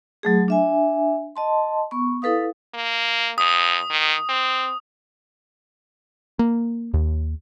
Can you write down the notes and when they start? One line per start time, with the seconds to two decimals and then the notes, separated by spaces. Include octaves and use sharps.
0.23 F#3 A3 G#4
0.48 D4 E5 G#5
1.36 D#5 A5 C6
1.91 B3 C#6
2.22 E4 A4 B4 F5 D#6
2.74 A#3
3.38 F2 D#6
3.90 D#3
4.29 C4
6.39 A#3
6.94 D#2